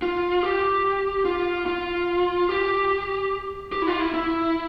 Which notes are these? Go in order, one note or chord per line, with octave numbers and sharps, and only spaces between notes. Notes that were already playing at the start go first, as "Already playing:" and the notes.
F4
G4
F4
F4
G4
G4
E4
F4
E4
E4